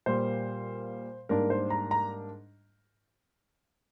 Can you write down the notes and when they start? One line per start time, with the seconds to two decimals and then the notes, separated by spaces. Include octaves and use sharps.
0.06 A#2 G3 A#3 C5
1.29 G#2 G3 A#3 D4 A#4
1.50 C5
1.70 A#5
1.91 A#5